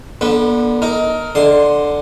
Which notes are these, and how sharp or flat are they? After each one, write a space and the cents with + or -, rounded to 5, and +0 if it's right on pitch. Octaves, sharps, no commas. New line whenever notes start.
D3 +0 B3 -45 B4 -20
D#4 +25 A#4 +0
D3 +0 C6 +0